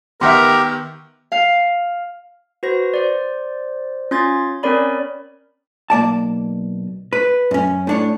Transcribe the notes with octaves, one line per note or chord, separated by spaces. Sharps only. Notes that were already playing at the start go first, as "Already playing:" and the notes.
D#3 B3 G4 A#4 E5 F#5 C6
F5
F#4 B4 C5 A#6
C5 D5
C#4 F4 C6 G#6 A6
C4 C#4 A#4 C#5 D5 B5
B1 A#3 D5 A5
B4
F#2 C#4
A2 D4 C#5